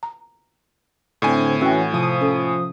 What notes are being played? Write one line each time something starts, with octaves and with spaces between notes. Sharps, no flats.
A#5
A2 D3 C4 G#5
E3 C#4 F#4 G5 E6
C3 F3 D#6
C#4 A4